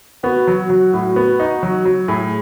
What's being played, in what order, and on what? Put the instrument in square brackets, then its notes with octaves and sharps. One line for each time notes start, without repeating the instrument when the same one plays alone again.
[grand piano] B3 [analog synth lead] F#4
[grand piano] F#3
F#3
A2
B3
D#4
F#3
F#3
[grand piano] A2 [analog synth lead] G#4